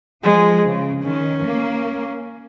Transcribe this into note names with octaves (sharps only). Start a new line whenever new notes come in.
F3 G#3
C#3
D#3 C#4
A#3